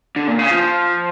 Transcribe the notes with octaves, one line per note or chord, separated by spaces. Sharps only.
D3
A#2
C#3
F3